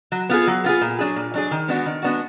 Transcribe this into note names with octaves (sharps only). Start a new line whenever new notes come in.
F#3
B3 F4 G#4
F#3
B3 F4 G#4
A#2
F#3 D4 G#4
A#2
F#3 D4 G#4
D#3
G#3 B3 D4 F#4
D#3
G#3 B3 D4 F#4